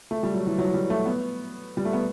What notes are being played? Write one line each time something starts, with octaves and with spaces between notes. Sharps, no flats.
A3
G3
F#3
E3
F#3
G3
A3
B3
G3
A3
B3